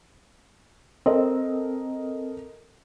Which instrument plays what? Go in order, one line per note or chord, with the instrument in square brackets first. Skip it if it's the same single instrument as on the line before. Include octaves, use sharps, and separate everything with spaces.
[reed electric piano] C4 [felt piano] A4 A#4 D#5